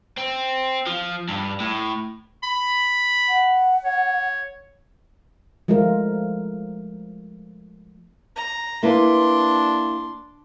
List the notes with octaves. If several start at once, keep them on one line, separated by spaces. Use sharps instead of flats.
C4
F3
G2
A2
B5
F#5
C#5
F3 G#3 A3 F4 A#4
A#5
A#3 D4 E4 B4 C6